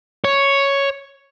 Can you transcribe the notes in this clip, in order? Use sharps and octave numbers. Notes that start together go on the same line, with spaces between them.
C#5